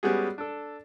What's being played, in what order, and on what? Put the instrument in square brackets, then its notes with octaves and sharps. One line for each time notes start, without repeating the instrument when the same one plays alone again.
[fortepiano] G3 G#3 B3 C#4 F#4 G#4
D4 A4